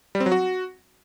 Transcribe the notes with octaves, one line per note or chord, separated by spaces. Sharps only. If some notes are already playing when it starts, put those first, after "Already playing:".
G3
C4
F#3
F#4